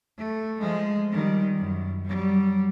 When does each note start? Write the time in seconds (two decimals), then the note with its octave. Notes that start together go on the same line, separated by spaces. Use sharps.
0.18 A3
0.60 F3 G#3
1.12 D#3 G3
1.58 F#2
2.04 F#3 G3